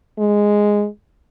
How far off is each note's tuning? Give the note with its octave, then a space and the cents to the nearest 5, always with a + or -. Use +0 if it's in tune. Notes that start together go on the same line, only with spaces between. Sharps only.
G#3 -5